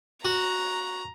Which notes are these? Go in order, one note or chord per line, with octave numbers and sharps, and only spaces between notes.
F#4 A#5